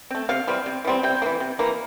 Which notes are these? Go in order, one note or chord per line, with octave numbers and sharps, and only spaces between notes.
A3 C4
C3 F5
E3 G3 C4
C3
E3 G3 C4
C3 G5
A#3
E3
C3
E3 A#3